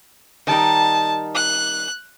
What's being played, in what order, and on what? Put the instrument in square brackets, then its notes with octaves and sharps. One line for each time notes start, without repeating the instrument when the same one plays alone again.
[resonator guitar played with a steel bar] D#3 G3 D#4 [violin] A5
[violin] F#6